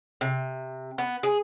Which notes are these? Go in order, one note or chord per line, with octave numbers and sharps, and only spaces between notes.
C3
B3
G#4